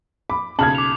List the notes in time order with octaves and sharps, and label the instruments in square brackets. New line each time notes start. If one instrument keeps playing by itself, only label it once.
[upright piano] B5 [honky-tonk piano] D6
[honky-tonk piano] B1 C#3 F#7 [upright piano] A5 F6 G#6
[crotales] D6 F7